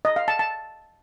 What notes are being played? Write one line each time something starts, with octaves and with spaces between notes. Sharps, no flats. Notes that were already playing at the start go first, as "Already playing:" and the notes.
D#5
F5
A5
A5